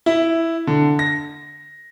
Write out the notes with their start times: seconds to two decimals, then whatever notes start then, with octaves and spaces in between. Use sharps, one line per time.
0.06 E4
0.67 D3
0.99 A#6